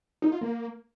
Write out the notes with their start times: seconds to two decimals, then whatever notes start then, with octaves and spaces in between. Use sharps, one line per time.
0.22 D#4
0.32 F4
0.41 A#3